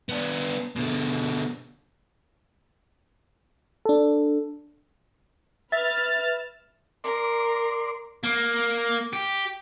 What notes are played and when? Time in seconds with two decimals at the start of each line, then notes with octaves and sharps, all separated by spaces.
0.09 B3 D4
0.76 B2 D3
3.85 D4 A4
5.72 B4 E5 F6 A6
7.04 A#4 D5 C6
8.24 A#3
9.13 G4